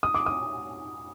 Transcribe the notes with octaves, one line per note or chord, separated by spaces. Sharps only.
D#6
D6
D#6